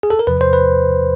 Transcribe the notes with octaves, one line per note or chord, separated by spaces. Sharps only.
G#4
A4
A#4
E2 C3 F3 B4
C5
B4